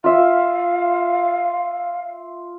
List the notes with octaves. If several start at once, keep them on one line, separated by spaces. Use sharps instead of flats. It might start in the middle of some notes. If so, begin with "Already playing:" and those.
F4 E5 F5